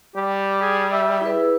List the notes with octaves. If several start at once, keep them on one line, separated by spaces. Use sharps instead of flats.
G3 G4
G#4
E5
E4 G#4 B4